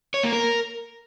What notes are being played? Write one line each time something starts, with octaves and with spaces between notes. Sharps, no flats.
C#5
A#3
A#4